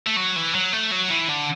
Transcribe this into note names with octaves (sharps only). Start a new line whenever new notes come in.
A3
F#3
E3
F#3
A3
F#3
E3
D3